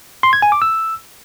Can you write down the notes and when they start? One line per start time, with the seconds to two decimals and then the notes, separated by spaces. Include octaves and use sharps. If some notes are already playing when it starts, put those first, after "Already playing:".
0.23 C6
0.33 G#6
0.42 G#5
0.52 D6
0.62 E6